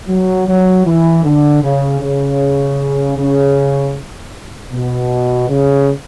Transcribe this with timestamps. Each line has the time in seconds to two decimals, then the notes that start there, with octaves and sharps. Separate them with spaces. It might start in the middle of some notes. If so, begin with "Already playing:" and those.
0.09 F#3
0.47 F#3
0.86 E3
1.24 D3
1.63 C#3
2.01 C#3
3.17 C#3
4.72 B2
5.49 C#3